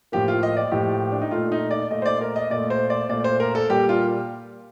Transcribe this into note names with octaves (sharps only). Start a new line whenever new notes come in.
A2 F3 A#3 G4
F4
D#5
D5
A2 F3 A#3 G4
D4
D#4
A#2 A3 F4
D#4
D5
A#2 A3 D#5
C5
D5
A#4
D#5
A#2 A3 D5
C5
D5
A#2 A3 D5
C5
A#4
A4
A#2 G3 A#3 G4
F4